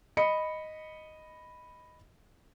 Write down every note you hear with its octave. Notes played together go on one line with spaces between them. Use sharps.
D#5 B5 C#7